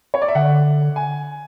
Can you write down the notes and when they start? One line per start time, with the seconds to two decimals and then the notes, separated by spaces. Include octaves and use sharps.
0.14 C#5
0.22 D5
0.28 E5
0.35 D3 F#5
0.96 G#5